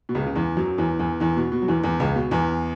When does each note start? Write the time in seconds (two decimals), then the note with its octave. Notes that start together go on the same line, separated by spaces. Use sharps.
0.09 B2
0.15 C#2 C#3
0.26 C#3
0.35 E2 E3
0.57 F#2 F#3
0.78 E2 E3
0.99 E2 E3
1.20 E2 E3
1.37 B2
1.52 B2
1.62 F#3
1.68 E2 E3
1.83 E2 E3
2.00 C#2 C#3
2.16 B2
2.31 E2 E3